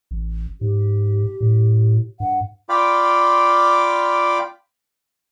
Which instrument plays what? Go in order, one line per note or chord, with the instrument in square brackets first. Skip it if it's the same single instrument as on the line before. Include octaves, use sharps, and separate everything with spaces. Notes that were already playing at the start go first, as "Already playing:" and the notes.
[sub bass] A1
[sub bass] G#2 [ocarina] G4
[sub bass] A2
[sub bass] G2 [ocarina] F#5
[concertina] F4 D5 F5 G5 B5 D6